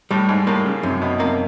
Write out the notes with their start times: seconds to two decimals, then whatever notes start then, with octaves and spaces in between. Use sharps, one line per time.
0.11 A2 G3
0.29 G#2
0.47 A2 A#3
0.66 C#3
0.83 F#2 C3
1.02 B2
1.20 C3 A#3